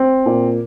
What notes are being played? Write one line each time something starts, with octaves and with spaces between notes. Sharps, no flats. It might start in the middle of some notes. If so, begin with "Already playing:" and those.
Already playing: C4
A#2